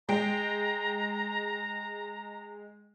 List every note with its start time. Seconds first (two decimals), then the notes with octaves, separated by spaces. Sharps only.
0.09 G#3 G5 A#5 D7